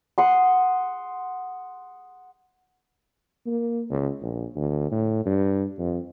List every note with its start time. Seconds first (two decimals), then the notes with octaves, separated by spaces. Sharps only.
0.18 F#5 C6 D#6
3.46 A#3
3.90 C#2
4.22 A#1
4.56 D2
4.91 A2
5.26 G2
5.79 F2